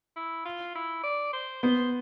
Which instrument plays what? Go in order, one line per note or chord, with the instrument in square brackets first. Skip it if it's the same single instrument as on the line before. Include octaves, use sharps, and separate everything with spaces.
[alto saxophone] E4
F4
E4
D5
C5
[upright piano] B3 [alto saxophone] C5